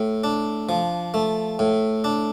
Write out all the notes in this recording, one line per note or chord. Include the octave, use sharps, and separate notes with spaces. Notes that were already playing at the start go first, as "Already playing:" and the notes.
Already playing: A2
D4
F3
A3
A2
D4